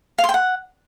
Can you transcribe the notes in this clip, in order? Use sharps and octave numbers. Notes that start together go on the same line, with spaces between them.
F5
C6
G5
F#5